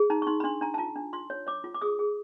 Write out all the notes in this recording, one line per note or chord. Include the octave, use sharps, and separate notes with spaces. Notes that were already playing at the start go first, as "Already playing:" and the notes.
Already playing: G#4
D#4 A#5
C#6
D#4 C6
B5
D4 C6
D4 A#5
A5
F4 A#5
D4
F4 C6
C#5
C#5 D6
F4
D6
G#4 D#6
G#4